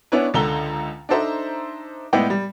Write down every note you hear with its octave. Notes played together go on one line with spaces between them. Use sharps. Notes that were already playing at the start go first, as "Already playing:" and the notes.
B3 C#4 D4 E4 B4 C#5
C#2 D3 A4 A#5 G7
D4 D#4 A4 C5 E5 A#5
A2 G#3 B3 E4 D5 G5
G3